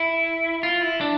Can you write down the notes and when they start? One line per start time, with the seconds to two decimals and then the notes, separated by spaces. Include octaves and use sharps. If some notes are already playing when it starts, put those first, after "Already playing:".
Already playing: E4
0.63 F4
0.82 E4
1.01 D4